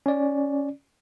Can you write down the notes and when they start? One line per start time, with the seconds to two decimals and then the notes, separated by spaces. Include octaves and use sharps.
0.06 C#4 D5